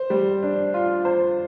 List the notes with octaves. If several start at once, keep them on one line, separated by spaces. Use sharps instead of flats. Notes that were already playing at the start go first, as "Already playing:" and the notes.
Already playing: C5
G3
D4
F4
C5